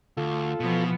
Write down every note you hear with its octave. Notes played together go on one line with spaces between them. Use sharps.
D2 F4 A4
B2 E3 F3 B3